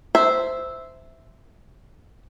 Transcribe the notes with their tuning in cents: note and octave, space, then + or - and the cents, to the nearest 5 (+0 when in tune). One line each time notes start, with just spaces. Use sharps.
C5 -10 E5 -5